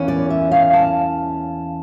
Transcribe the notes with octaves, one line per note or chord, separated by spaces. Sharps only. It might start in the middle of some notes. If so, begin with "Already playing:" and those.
Already playing: E2 E3 A#3 C#4
D5
E5
F5
A5